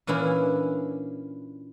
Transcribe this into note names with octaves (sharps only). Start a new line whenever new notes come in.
A#2 E3 C#4 D4 E4